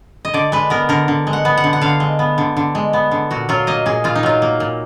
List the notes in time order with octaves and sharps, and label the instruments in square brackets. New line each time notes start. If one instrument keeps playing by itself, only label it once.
[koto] D#5
D3 D5
G#3 B4
B3 A#4
D3 A#4
D3
G#3
F#5
B3
F#5
D3
F#5
D3 F5
G#3
B3
D3
D3
G#3
B3
D3
A#2 F#4
F#3 F4
A#3 D#5
A#2 G#4
A#2 F4
D#4
F#3 F4
A#3
A#2